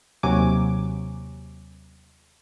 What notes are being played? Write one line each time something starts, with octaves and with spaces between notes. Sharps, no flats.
D#2 C3 F#3 G#5 D6